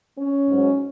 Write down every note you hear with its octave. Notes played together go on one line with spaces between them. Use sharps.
C#4
G#2 F#3